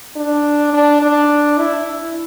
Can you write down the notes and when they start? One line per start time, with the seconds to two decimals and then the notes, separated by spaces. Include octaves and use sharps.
0.16 D4
0.74 D4
1.02 D4
1.59 E4